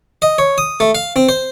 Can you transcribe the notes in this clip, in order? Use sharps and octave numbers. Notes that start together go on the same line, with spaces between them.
D#5
C#5
D#6
A3
F5
C4
C5